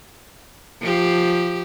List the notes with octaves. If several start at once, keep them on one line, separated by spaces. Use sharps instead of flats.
F3 G4